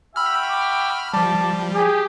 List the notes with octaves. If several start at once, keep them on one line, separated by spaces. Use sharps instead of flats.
F#4 E5 G5 B5 E6 F6
D6
F3 G3 A5 D6
G4 G#4 G#5